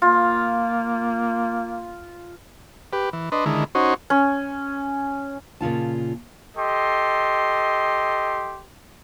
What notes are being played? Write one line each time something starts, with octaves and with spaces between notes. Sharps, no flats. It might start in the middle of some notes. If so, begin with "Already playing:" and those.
A#3 F4
G4 B4
E3
D4 B4 D#5 C6
D3 D#3 G#3 E4
C#4 D#4 F#4 C5
C#4
A#2 C#3 F4 A5
G4 A4 D#5 C6